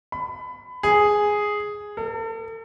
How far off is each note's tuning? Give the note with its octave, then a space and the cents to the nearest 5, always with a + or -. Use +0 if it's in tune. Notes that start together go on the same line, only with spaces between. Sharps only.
B5 +25
G#4 +0
A4 +40